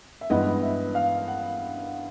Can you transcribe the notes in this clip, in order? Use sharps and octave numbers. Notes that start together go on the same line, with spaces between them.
E5
G2 E3 G#3 B3 D#5
E5
F5
F#5